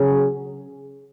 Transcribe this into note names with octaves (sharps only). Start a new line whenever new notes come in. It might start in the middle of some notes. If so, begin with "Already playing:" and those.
Already playing: C#3 F#3 C#4 G#4